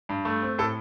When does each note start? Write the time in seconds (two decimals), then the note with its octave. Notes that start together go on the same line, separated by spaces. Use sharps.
0.09 G2
0.25 A3
0.42 C4
0.58 A2 A4